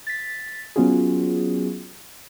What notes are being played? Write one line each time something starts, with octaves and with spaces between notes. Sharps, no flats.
A6 B6
F#3 B3 C#4 F4 F#4 G#4